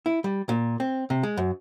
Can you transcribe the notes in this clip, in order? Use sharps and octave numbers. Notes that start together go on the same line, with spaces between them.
E4
G3
A#2
C4
C3
G#3
F#2